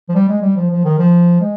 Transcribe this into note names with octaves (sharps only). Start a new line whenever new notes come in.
F3
G3
G#3
G3
F3
F3
D#3
F3
G#3